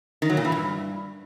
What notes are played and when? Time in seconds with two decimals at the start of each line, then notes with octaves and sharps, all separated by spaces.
0.22 D#3
0.30 F#3
0.37 A#2
0.45 E3
0.52 G2